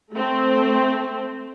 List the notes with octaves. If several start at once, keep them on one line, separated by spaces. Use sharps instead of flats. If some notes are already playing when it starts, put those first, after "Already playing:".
A3 C4